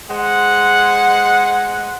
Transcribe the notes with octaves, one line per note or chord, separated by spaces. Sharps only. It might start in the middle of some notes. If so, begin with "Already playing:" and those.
G#3 C5 F#5